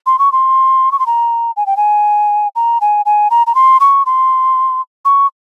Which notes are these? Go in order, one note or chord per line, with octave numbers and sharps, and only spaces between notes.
C6
C#6
C6
C#6
C6
A#5
G#5
G5
G#5
A#5
G#5
G#5
A#5
A#5
C6
C#6
C6
C#6